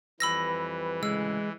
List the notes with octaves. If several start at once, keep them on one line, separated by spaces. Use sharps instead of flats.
F2 E3 G3 B4 B5 E6 A#6
D2 A2 C#3 G#3 E6